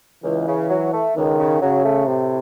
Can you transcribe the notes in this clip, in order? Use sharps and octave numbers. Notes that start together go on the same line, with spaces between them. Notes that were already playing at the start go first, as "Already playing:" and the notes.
C#2 E3
C#3
F#3
A3
C#2 D#3
C#3
C#3 F#3
A3
A2 C3